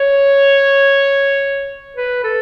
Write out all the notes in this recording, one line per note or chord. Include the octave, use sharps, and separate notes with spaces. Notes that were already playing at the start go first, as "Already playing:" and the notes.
Already playing: C#5
B4
A4